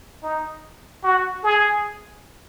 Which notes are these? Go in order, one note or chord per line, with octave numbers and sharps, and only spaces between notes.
D#4
F#4
G#4